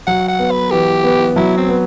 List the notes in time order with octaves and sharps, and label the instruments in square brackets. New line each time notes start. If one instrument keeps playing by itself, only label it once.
[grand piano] F#3 [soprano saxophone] F#5
[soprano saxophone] F#5
[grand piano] B3
[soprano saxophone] B4
[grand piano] E3 [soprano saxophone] G4
[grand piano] B3
[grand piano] F#3 [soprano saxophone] E4
[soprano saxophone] C4
[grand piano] B3